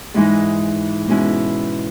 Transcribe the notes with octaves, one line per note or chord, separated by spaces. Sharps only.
G#2 E3 G#3 D#4
B2 G#3 C#4 E4